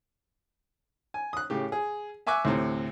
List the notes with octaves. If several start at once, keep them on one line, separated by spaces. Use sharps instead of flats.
G#5
D#6 F#6
A2 C#3 G4
G#4
E5 G#5 C#6 D6 E6 F#6
D2 A2 C3